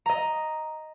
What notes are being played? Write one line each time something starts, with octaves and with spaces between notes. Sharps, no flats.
D#5 A#5